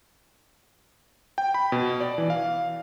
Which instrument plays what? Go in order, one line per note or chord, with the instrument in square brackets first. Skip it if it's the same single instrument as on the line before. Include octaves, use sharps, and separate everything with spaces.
[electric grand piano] G5
B5
B2
D5
E3
F5